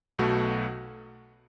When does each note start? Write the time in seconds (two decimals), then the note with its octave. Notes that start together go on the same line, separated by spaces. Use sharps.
0.18 B1 B2 A3 F#4